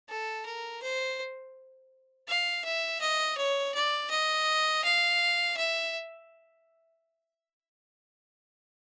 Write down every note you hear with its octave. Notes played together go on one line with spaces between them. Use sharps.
A4
A#4
C5
F5
E5
D#5
C#5
D5
D#5
F5
E5